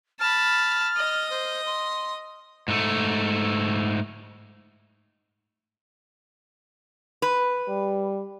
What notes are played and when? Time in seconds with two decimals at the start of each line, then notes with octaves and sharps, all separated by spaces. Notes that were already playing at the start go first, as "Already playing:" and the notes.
0.20 A5 B5 F6
0.97 D#5
1.30 C5
1.66 C6
2.68 G#2 A3
7.22 B4
7.68 G3